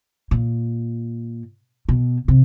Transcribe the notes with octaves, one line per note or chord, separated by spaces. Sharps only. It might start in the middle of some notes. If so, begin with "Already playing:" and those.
A#2
B2
C3